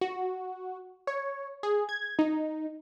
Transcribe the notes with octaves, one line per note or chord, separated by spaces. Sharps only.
F#4
C#5
G#4
G#6
D#4